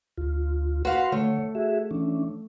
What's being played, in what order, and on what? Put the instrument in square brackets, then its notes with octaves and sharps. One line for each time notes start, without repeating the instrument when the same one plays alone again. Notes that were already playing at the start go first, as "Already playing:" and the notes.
[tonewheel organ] D2 F4
[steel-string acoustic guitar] F#4 F5 [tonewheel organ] B4 F#5 C6
[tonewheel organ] D3 C#5 [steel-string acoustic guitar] A3
[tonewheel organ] F#4 G#4 E5
E3 C#4 D4